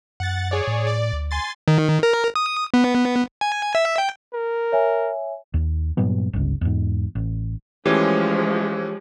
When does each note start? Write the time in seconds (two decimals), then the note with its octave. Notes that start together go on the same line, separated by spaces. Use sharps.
0.20 F#2 F#5 A6
0.51 G#4 C#5 D5
0.67 A2
0.87 D5
1.13 D2
1.31 G#5 C6 A6
1.68 D#3
2.03 A#4
2.36 D#6
2.74 B3
3.41 G#5
3.75 E5
3.98 G5
4.33 A#4
4.72 C#5 E5 G#5
5.54 D#2
5.97 G2 A#2 F#3 B3
6.33 G1 C#2
6.61 E2 G#2
7.15 A1
7.86 E3 F3 G#3 A3 C#4 G4 C#5